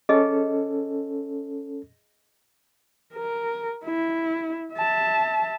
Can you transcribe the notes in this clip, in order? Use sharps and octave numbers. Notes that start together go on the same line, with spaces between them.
C#4 G#4 A4 D#5
A#4
E4
E5 A5